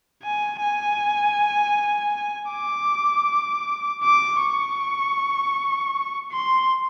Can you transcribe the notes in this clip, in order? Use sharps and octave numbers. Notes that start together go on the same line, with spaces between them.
G#5
G#5
D6
D6
C#6
C6